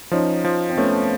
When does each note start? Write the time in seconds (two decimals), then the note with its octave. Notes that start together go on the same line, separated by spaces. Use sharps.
0.11 F3 C#4 D#4
0.44 F3
0.69 C4
0.77 A3 B3 C#4